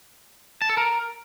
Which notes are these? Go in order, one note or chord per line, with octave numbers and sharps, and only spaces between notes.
A5
A4
A#4